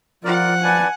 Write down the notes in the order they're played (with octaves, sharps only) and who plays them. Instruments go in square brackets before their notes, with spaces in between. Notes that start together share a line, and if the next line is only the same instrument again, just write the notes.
[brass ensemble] F3 [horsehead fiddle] F4 [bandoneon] A#4 D5 [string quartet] F#5
[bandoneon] B4 D5 A5 [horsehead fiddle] G#5